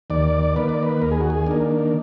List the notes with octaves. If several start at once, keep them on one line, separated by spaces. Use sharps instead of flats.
D#2 D5
D#3 A#3 B4
D5
B4
D#2 A#4
G#4
F#4
G#4
D#3 A#3 D4